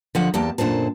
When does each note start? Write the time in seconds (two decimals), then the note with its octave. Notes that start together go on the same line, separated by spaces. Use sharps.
0.15 D3 F3 F#5
0.34 E2 A#3 G4 A5
0.58 F#2 A#2 D3 C5 A5